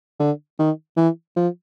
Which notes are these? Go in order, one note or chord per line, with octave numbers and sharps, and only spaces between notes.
D3
D#3
E3
F3